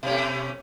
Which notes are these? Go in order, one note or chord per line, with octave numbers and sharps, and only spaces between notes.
B2 A3 C#4